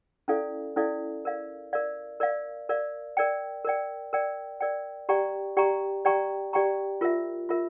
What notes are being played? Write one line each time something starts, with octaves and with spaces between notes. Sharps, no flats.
C#4 E4 A4 D5 F5
C#4 E4 A4 D5 F5
A#4 D5 F5
A#4 D5 F5
A#4 D5 F5
A#4 D5 F5
A#4 D5 G5
A#4 D5 G5
A#4 D5 G5
A#4 D5 G5
G4 D5 G5 A#5 C#6
G4 D5 G5 A#5 C#6
G4 D5 G5 A#5 C#6
G4 D5 G5 A#5 C#6
F4 A#4 E5
F4 A#4 E5